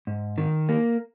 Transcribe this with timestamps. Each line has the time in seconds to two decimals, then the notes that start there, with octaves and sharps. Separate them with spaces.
0.07 G#2
0.38 D#3
0.69 A#3